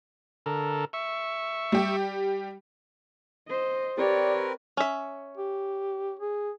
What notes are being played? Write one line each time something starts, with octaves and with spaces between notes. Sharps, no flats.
D3 A4 A#4
E5 C#6
G3 G4
C5 D#5
C4 G4 A#4 B4 C#5 D5
C#4 E5
G4
G#4